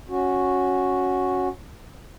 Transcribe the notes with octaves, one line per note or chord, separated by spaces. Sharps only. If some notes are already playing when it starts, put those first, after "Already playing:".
C#4 F#4